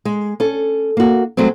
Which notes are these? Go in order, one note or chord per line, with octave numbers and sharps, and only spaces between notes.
G#3
C#4 A4
A#3 F#4
F#3 G#3 A3 C4